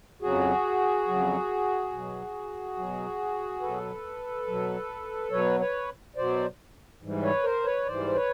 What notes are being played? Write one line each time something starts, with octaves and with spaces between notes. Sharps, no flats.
F2 C#3 F#3 F#4 G#4
F2 C#3 F#3
B2 F#3
B2 F#3
B2 F#3 A4 B4
B2 F#3
B2 F#3 B4 C#5
B4 C#5
B2 F#3 C5 D5
G#2 E3 G3
B4 C#5
A#4 C5
B4 C#5
G#2 E3 G3 C5 D5
B4 C#5